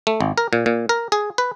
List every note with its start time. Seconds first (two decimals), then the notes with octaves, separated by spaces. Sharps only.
0.07 A3
0.21 G#1
0.38 A#4
0.53 A#2
0.66 A#2
0.89 A#4
1.12 G#4
1.38 B4